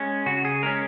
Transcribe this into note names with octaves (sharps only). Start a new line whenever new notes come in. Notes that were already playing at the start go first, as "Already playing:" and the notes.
Already playing: G#3 C#4
C#3 F#4
G#4
G#3 C#4 A#4